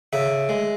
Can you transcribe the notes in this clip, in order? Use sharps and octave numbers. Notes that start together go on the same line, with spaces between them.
C#3 E5
G#3